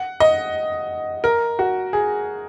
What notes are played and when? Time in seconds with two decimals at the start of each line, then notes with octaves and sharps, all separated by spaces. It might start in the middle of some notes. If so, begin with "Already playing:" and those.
Already playing: F#5
0.20 D#5
1.24 A#4
1.59 F#4
1.93 G#4